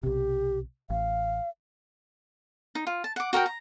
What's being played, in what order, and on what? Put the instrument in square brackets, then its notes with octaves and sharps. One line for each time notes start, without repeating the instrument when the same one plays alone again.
[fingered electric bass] B1 C3 [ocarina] G4
[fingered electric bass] A1 [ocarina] F5
[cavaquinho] D#4
F4
A5
F#5 D6
F#4 A#4 D#5 G5
A#5